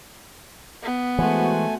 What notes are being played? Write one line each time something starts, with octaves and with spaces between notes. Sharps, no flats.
B3
E3 G#3 A3 F#4 C5 F#5 G#5